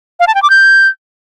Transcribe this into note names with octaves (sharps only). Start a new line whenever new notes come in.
F5
A5
G5
D6
G6